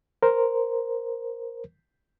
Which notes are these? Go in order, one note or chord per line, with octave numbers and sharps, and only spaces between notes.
A#4 C5